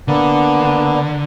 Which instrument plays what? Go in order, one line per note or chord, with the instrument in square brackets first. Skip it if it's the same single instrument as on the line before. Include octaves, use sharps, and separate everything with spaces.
[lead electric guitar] D3 [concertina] A#3 B3 D4